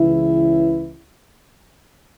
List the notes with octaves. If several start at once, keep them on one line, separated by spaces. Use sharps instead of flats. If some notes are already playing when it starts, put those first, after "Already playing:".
Already playing: C#2 C#3 E3 E4